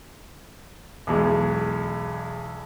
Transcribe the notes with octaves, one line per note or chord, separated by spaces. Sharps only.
B1 E2 G#3